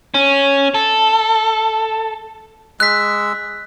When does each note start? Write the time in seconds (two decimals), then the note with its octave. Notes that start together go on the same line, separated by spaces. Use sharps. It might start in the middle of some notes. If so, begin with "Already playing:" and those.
0.14 C#4
0.75 A4
2.80 G#3 E6 F#6 B6